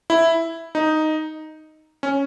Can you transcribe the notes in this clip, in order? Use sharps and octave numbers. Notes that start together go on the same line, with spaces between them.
E4
D#4
C#4